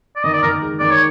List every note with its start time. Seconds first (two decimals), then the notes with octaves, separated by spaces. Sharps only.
0.16 D5
0.24 D#3 D#5
0.33 D5
0.43 D#3 A#4
0.62 G#3
0.79 D#3 D5
0.91 C#5